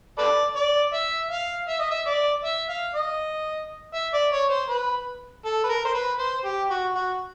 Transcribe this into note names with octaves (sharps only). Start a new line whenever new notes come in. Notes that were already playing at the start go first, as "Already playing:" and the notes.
A4 B4 D5
D5
E5
F5
E5
D#5
E5
D5
E5
F5
D#5
E5
D5
C#5
C5
B4
A4
B4
A#4
C5
B4
C5
G4
F#4
F#4